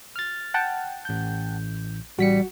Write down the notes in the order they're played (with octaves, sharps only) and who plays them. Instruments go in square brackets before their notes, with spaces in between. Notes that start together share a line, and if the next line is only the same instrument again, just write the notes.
[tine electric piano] F6 A6
[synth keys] F#5 G5 A5
[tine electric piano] A1 G6
[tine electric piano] A1 B6 C#7 [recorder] G3 [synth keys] F#4